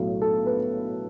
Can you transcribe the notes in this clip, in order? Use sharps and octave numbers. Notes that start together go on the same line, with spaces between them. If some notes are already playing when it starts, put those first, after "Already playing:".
Already playing: B1 A2 F#3
A4
B4